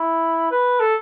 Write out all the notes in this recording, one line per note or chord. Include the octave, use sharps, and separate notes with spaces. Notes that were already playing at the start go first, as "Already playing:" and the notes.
Already playing: E4
B4
A4